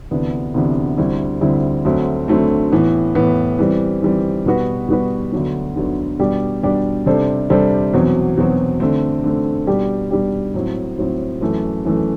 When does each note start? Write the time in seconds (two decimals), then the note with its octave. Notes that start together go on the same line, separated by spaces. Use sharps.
0.11 D2 C3 E3 B3 D4
0.54 D2 C3 E3 B3 D4
0.98 D2 D3 G3 C4 E4
1.41 D2 D3 G3 C4 E4
1.85 D2 D3 F#3 A3 C4
2.28 D2 D3 F#3 A3 C4
2.72 A2 E3 B3
3.15 A2 E3 B3
3.59 E3 G3 C4
4.02 E3 G3 C4
4.46 B2 G3 B3 F#4 B4
4.88 B2 G3 B3 F#4 B4
5.32 D2 D3 F#3 B3
5.76 D2 D3 F#3 B3
6.19 B2 G3 D4 G4 D5
6.63 B2 G3 D4 G4 D5
7.06 C3 G3 D4 A4 C5
7.50 C3 G3 D4 A4 C5
7.93 E2 B2 F#3 C4
8.37 E2 B2 F#3 C4
8.80 D3 A3 C4
9.24 D3 A3 C4
9.67 B2 G3 D4 G4
10.11 B2 G3 D4 G4
10.54 A2 F#3 C4
10.98 A2 F#3 C4
11.41 F#2 E3 A3
11.85 F#2 E3 A3